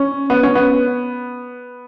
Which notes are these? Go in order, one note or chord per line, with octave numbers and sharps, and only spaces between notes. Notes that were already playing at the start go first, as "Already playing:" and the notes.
Already playing: C#4
B3
C#4
B3